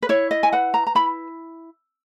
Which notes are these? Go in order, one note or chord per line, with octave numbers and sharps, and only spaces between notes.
B4
E4 C#5
D#5
G#5
B4 F#5
A#5
A#5
E4 B5